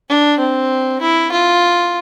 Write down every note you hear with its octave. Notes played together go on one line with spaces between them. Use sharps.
D4
C4
E4
F4